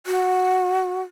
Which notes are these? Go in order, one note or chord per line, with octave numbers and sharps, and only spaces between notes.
F#4